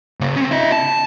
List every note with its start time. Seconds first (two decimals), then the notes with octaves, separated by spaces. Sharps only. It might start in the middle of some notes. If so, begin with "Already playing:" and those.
0.21 C#3 A#3
0.36 C4 C#4
0.51 E4 D#5
0.72 A5